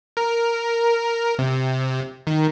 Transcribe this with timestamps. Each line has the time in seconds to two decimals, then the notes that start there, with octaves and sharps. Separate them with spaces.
0.17 A#4
1.39 C3
2.27 D#3